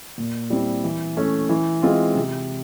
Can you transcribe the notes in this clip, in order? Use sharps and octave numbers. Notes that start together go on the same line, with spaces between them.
A#2
G3 C4 E4
E3
A3 C#4
E3
G#3 C4 F4
C3